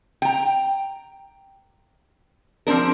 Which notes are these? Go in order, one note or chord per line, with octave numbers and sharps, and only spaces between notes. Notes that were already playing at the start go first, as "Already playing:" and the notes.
G5 A#5
F3 C4 D4 A#4